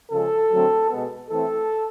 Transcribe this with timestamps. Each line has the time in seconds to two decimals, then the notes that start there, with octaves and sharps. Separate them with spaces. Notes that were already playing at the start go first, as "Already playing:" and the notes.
0.12 C#3 F3 G#3 A4
0.52 D3 F#3 A3 C4
0.91 B2 G#3 B3
1.31 E3 A3 C4 A4